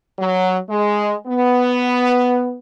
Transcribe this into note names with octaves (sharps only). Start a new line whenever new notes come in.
F#3
G#3
B3